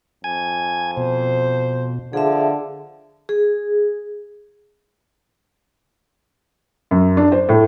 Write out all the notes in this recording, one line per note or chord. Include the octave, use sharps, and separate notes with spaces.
F2 G#5 G#6
B2 C5
D3 F3 G#4 E5
G#4
F#2
D4
C5
A2